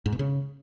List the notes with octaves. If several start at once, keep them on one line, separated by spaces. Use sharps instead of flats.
G#2
B2
C#3